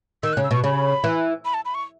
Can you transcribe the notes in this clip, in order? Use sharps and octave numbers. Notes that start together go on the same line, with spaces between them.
D#3 E6
F#6
C#3
E6
B2 C#6
C#3 B5
E3
B5
A5
B5
C#6